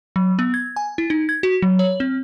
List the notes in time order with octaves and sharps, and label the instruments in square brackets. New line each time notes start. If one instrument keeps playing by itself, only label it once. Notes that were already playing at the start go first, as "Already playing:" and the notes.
[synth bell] F#3
B3
G#6
G#5
E4
D#4
G#6
F#4
F#3
C#5
C4